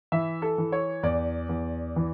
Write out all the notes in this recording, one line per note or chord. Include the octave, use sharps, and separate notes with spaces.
E3 E5
A4
E3
C#5
E2 D5
E2
E3